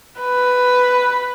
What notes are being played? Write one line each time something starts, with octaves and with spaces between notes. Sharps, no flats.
B4